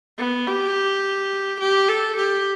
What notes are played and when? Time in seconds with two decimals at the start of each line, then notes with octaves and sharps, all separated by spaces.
0.18 B3
0.46 G4
1.60 G4
1.88 A4
2.16 G4